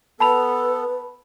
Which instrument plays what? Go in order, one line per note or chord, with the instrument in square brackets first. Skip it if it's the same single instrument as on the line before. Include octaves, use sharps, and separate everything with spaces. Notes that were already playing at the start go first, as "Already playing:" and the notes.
[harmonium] B3 A4 [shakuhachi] B4 [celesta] A5 B5 F7